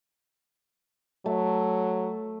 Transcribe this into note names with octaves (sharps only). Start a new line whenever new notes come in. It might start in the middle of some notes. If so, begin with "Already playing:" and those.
F#3 A3